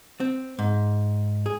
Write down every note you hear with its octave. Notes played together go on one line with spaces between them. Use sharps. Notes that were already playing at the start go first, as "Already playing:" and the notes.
C4
G#2
G#4